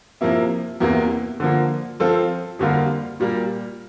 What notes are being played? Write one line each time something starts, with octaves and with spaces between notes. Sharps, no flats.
C3 F3 A#3 E4
E2 C3 E3 A#3
D3 F3 A#3
F3 C4 F4 A4
F2 D3 G3 A#3 F4
A#2 G3 A#3